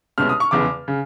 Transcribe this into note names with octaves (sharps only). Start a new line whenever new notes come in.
C2 B2 G#3 C#4 F6
D#6
C#6
F1 E2 C#3 D6
C#3